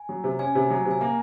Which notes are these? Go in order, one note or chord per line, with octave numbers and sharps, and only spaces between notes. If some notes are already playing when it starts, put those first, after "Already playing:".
Already playing: G#5
F#3
C3
C#4 G#5
C3
F#3
C3
G#5
A#3 A#5